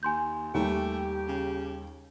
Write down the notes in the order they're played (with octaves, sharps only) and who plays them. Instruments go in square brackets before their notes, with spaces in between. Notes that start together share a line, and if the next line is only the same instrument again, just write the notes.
[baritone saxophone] D#2 [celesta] G#5 C6 G6
[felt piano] D#2 G3 [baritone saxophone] A3 [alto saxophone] G4
[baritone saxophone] C#3